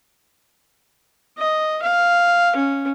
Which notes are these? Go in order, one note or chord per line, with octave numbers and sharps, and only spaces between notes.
D#5
F5
C#4